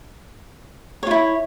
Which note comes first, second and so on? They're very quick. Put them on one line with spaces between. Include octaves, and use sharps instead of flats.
C#5 F4 E4